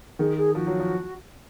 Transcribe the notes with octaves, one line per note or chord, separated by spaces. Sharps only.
D#3 G#4
G#4
F3 F#4
F#3
F3